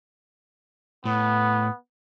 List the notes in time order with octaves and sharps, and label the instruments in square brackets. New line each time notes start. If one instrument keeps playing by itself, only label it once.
[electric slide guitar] A2 [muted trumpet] B3